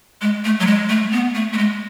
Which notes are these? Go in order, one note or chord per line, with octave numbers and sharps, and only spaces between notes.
G#3
A3
F#3
G#3
A3
B3
A3
A3
G#3